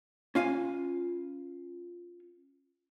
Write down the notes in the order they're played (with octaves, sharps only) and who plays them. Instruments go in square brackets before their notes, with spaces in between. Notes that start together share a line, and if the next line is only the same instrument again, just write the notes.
[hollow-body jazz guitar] C#4 F4 F5 G#5